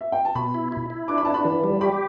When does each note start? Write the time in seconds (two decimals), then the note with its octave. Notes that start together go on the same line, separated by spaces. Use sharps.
0.01 E5
0.12 G5
0.25 A5
0.35 B2 B5
0.54 E4
0.72 E4
0.90 E4
1.08 D4 D6
1.18 B5
1.25 D4 A5
1.34 B5
1.45 E3
1.64 G3
1.81 G4 B5